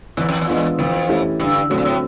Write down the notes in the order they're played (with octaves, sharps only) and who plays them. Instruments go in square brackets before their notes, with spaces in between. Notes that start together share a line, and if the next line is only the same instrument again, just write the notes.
[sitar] E2 [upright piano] E3
[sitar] F2
E2
[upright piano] G#3 B3 D4 F4
[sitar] F2 [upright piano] E3
[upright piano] A3 C#4 E4 G4
[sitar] G2 [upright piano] D3
[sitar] A2 [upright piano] F#3 A3 C4
[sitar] A#2
A2